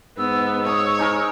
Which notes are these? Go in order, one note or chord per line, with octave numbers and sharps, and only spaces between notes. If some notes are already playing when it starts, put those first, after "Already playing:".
G#2 B3 E6
C#5 D#6
D#4 G#4 A#4